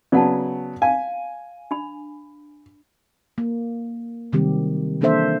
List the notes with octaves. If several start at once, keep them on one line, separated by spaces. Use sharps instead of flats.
C#3 F#3 B3 D5 F#5 A5
F5 G#5
D4 B5
A#3
C3 D#3 F#3 G3 C4 G4
E3 A#3 D4 A4 C5 E5